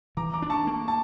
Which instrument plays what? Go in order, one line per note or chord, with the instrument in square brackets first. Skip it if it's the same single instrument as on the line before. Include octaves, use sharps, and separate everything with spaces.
[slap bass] E3 [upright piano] A#5 D6
[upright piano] A#5 D6
[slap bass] D4
[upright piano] A5 C#6
[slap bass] A#3
[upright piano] A5